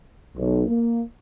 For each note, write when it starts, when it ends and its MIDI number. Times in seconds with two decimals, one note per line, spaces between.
0.37 0.64 35
0.67 1.01 58